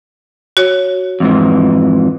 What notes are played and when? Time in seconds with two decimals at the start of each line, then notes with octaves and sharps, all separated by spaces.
0.57 F#4 C#5
1.20 F2 G#2 E3